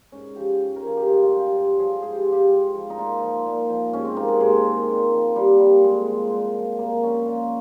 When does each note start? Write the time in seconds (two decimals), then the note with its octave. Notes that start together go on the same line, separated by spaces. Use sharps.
0.12 G#2 C#4
0.36 F3 G4
0.60 G#2
0.76 A#4
0.84 F3 G#4
0.97 G4
1.07 G2 F4
1.23 F4
1.31 F3
1.39 G4
1.54 G2 G4
1.79 F3 G#4
2.02 G#2 G#4
2.12 G4
2.22 F3 F4
2.32 G4
2.50 G#2
2.74 F3
2.90 D#4
2.98 A#2 F4
3.22 F3
3.46 A#2
3.69 F3
3.93 G#2 C#4
4.05 C4
4.16 D#3 A#3
4.28 G#3
4.40 G#2 G#3
4.48 A#3
4.56 G#3
4.65 D#3
4.89 A#2
5.12 F3
5.35 A#2 G3
5.60 F3 G3
5.84 A#2 G#3
6.08 F3
6.31 A#2
6.55 F3
6.79 A#2 A#3
7.03 F3 C#4
7.26 A#2 F4